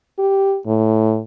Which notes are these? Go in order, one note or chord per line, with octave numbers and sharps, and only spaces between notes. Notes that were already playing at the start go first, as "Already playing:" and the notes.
G4
A2